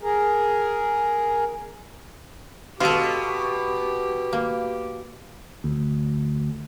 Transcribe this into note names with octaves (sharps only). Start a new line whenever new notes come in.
G#4 A#4
B2 F4 G4 A4
A#3
D2